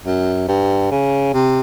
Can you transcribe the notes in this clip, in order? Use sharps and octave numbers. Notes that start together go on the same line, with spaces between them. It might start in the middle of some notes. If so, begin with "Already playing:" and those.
F#2
G2
C#3
C3